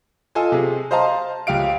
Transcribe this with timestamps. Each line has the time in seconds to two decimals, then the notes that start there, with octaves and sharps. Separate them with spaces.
0.35 F4 A4 D#5 G#5
0.52 C3 G#4
0.91 C5 D#5 F5 A5 A#5 C6
1.47 C#2 G4 F5 D7